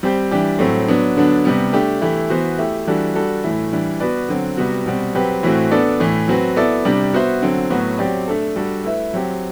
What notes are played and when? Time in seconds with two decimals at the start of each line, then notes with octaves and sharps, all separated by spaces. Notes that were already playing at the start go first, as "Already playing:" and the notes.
0.03 G3 C4 G4 C5
0.31 E3 G3 D4 G4
0.59 A2 F#3 A3 C4
0.88 F#3 B3 D4
1.17 D3 F#3 B3 D4
1.45 C3 G3 B3
1.73 A3 D4 G4
2.02 E3 A3 E4 G4
2.30 E3 B3 F#4 C5
2.59 A3 E4 G4
2.87 E3 G3 D4 F#4 A4
3.15 G3 D4 F#4 A4
3.44 A2 E3 A3 E4
3.72 E3 G3 D4
4.00 B3 F#4 B4 D5
4.29 D3 F#3 C4
4.57 C3 G3 B3 F#4
4.86 B2 G3 C4
5.15 F#3 C4 G4 B4
5.43 A2 E3 A3 C4 F#4
5.71 B3 D4 A4 D5
6.00 A2 E3 A3
6.28 F#3 C4 F#4 B4
6.56 B3 E4 A4 D5
6.85 C3 G3 D4
7.13 B3 F#4 C5 E5
7.42 D3 F#3 C4
7.70 A2 F#3 B3 F#4
7.99 F#3 C4 G4 D5
8.28 A3 D4 A4
8.56 G3 D4 F#4 A4
8.84 A3 E4 B4 E5
9.13 F#3 C4 G4